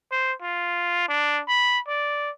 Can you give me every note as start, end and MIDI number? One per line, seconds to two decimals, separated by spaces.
0.11 0.33 72
0.42 1.05 65
1.08 1.42 62
1.48 1.79 83
1.88 2.30 74